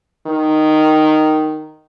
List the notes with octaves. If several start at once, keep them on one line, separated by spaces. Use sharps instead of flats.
D#3